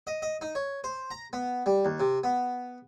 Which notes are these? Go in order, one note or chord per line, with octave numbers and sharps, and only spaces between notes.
D#5
D#5
D#4
C#5
C5
A#5
B3
G3
D#2
C3
B3